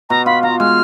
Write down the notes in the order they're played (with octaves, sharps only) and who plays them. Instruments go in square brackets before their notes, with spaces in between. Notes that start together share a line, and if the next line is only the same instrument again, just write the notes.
[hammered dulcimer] B2 [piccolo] A#5
[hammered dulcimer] F4 [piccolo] B5
[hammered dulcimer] F4 [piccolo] A#5
[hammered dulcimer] G#3 [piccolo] F6